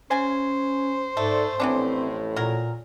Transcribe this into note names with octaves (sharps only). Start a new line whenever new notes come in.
C#3 C#4 C5 G#5
G#2 A3 A4 D5
A1 F2 A2 E3 B3 C4 D4
A#2 F#3 A#4